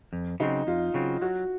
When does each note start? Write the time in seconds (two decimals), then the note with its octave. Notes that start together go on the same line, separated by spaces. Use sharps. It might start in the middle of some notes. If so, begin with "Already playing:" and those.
0.13 F2
0.40 C#3 F#3 C4 D#4
0.67 F2 F4
0.94 C#3 F#3 C4
1.22 F#3 F#4